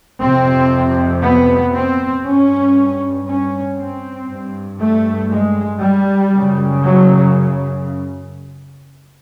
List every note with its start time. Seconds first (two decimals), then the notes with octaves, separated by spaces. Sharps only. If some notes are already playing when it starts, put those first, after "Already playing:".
0.22 F2 C3 C4
1.23 B3
1.74 C4
2.25 G2 C#4
3.27 C#4
3.78 C4
4.28 G2
4.80 A3
5.31 G#3
5.81 G3
6.32 F#2 C#3
6.83 F#3